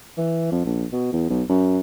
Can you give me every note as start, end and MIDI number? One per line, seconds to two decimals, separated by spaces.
0.17 0.51 52
0.52 0.62 41
0.65 0.85 34
0.92 1.11 47
1.13 1.29 40
1.30 1.43 35
1.49 1.80 42